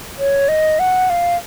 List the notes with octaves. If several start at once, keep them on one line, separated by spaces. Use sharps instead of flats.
C#5
D#5
F#5
F5